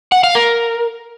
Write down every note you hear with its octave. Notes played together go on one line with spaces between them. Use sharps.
F#5
F5
A#4